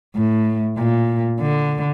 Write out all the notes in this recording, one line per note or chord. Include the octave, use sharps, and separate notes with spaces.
A2
A#2
D3